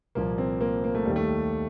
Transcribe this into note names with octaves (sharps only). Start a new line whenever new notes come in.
C2 A#2 F3 A#3
C4
A#3
A#3
A3
D#2 D#3 G3
A3